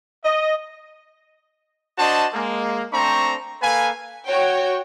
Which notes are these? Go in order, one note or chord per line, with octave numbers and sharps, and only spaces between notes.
D#5
D4 F#4 C5 D#5 A5
G#3 A#3
A3 C4 D4 C5 A#5 C#6
A#3 A4 B4 F5 G#5
F#4 C#5 G5